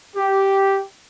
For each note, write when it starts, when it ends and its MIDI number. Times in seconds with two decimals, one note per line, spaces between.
0.16 0.81 67